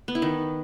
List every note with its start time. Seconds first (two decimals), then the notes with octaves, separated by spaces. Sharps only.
0.08 B3
0.15 E4
0.22 D#3